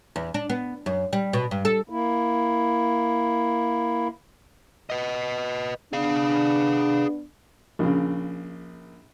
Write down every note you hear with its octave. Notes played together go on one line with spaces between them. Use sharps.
E2
D4
B3
F#2
G3
B2
G2
A4
A#3 E4
B4 D#5
B3 D4 G#4 F5
A#1 C#3